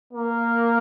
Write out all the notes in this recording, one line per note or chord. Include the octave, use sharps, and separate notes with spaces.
A#3